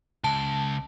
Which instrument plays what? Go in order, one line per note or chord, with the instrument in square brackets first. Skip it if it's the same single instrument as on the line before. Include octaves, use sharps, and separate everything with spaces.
[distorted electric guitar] C#2 [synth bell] A5